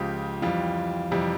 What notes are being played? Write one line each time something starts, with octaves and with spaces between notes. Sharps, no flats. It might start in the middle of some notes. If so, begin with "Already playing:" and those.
Already playing: C#2 C#3 F3 G4
F2 E3 G3 F4
F2 C3 E3 G3